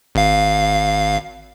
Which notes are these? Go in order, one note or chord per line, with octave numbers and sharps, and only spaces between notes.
G#1 F5